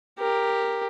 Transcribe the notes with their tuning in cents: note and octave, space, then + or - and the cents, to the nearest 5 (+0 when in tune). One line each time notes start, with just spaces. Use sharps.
G4 +10 A#4 +0